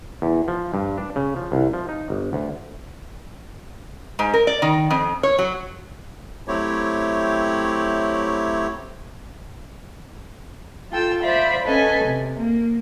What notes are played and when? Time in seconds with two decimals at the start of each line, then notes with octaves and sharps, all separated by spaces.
0.22 E2
0.48 F3
0.74 G2
0.98 D4
1.16 C#3
1.36 F3
1.52 C2
1.73 F3
1.89 D#4
2.10 G1
2.33 D2
4.19 G#2
4.34 A#4
4.47 D5
4.62 D#3
4.90 F2
5.23 C#5
5.39 F#3
6.48 F#3 A3 C4 E4 G4 C#5
10.92 F4 A4 G5 E6
11.21 C5 D5 E5 F5 B5
11.65 C#4 A4 B4 D#5 G#5
12.04 C3
12.40 A#3